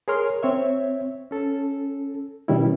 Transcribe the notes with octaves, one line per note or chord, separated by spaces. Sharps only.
G#4 A#4 C#5 C6 F6
C4 C#5 E5
C#4 A4
B2 D#3 G3 C#4 E4